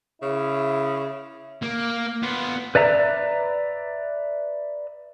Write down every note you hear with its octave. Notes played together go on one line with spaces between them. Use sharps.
C#3 E4
A#3
B3 F4
B4 D5 E5 A#5